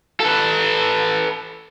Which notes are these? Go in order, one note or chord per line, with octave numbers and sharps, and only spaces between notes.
A4 B4